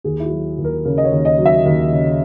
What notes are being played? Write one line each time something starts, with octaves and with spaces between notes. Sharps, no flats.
D#2 G#4
E4
F#4
F#3
D#2
A#4
C#3 A#4
D#5
C#5
D#2
D#5
F#3
E5
D#2
C#3